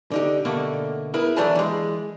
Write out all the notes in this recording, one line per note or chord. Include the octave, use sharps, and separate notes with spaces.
D3 D#4 G4
B2 D3 A3 A#3
B3 E4 G#4 A#4 B4
E3 F#3 A3 D4 G4 G#4
E3 G#3